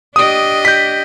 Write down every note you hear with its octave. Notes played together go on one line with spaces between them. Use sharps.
D4 G4 D#5 D#6
G6 B6